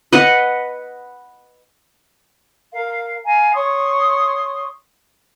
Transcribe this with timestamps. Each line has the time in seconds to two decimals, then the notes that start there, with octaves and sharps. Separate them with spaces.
0.12 B4 D#5 F#5
2.72 A#4 F5
3.25 F5 G#5 A#5
3.53 C#5 C6 C#6 D#6